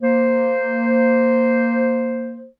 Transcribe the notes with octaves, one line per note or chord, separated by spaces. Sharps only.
A#3 C5